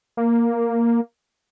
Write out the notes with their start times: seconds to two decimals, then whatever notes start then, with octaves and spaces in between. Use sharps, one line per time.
0.17 A#3